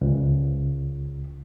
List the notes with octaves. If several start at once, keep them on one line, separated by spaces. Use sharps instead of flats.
C#2